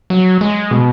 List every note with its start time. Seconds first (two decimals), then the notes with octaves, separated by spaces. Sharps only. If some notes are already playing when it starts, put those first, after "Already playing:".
0.10 F#3
0.41 G#3
0.71 B2